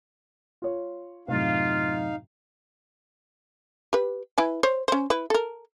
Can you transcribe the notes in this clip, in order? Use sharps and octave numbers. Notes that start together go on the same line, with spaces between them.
F4 C#5
F#2 A2 C3 D#4 F4 F5
G4 B4
E4 B4 G#5
C5 C#5
C#4 C5
E4 B4
A4 A#4